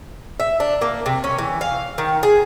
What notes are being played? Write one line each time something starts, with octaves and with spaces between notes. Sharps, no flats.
E5
D4
A#3
C3
C#4
E3
F5
D#3
G#4